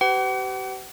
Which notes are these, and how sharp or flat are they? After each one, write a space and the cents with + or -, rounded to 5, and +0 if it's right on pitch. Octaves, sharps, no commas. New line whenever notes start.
G4 -35 B4 +45 F#5 +40